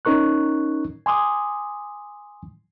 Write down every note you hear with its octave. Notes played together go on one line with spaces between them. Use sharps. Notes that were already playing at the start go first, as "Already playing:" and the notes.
C#4 D#4 A#4 C#6 F#6
G#5 C6 D6 D#6